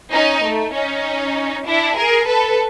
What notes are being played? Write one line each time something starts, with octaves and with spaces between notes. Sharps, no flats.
C#4 D#4
A3
C#4 D#4
D4 E4
G#4 A#4
A4 B4